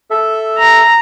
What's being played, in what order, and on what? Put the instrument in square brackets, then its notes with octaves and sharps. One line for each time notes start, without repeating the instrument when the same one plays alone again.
[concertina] A4 E5
[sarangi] A#5